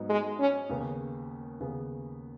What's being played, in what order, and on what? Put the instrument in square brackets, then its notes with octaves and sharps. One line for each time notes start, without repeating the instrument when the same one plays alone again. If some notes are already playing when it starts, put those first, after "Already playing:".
Already playing: [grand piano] G#2 F#3 B3 D#4
[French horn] G#3
C#4
[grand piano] D#2 C#3 B3 G#4
D#2 C#3 B3 G#4